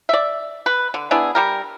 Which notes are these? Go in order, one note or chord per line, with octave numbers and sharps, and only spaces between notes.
D5 E5
B4
D3
B3 D4 E4 G#4
G3 G4 A#4